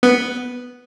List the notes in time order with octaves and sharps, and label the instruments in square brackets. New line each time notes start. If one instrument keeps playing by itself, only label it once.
[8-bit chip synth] B3